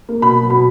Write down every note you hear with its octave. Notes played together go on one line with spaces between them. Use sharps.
A#3
B2 B5
F#3
B2 B5